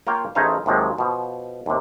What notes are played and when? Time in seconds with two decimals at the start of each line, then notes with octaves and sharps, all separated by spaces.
0.07 A#3 F4 A#4 C#5 F5 G5
0.35 A1 A3 D#4 G#4 C5 F5
0.66 D#2 C3 F3 F#3 G#3
0.98 B2 F3
1.66 D#2 C3